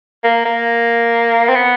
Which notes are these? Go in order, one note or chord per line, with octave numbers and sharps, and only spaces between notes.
A#3
A#3
C4
B3